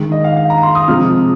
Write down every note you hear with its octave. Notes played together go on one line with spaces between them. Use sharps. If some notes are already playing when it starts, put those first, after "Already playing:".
Already playing: D#3 G#3
D#5
F5
F5
A#5
C6
D#6
C3 F3 G#3 F6